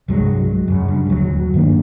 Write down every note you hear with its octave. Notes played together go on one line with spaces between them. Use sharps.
C2 G2 F#3 G#3
F#2 C#3
G2
D#1 D2 E3 F#3
G2 D#3 A#3 D4